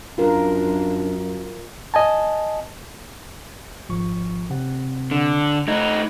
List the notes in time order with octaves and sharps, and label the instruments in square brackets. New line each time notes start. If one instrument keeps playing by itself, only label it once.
[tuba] F#2 [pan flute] D4 [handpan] F4 A#4
[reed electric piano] D#5 G#5 A5
[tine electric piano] G#1 F3 C#6
C3 C4 F#5
[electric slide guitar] D3
[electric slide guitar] A3 D#4 [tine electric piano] B5 F#6 G#6